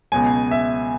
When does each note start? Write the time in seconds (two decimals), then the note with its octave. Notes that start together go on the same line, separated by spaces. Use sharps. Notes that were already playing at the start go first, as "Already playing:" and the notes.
0.12 C#2 B2 F#3 G#5
0.51 E5